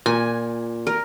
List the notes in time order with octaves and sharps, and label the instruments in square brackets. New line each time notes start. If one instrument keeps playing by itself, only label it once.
[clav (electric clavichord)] A#2 [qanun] G#5
[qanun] A#4